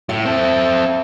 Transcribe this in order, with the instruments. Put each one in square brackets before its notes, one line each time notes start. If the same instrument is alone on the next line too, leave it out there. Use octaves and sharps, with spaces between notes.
[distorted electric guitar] A2 [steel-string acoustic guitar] E5
[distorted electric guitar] C4 A4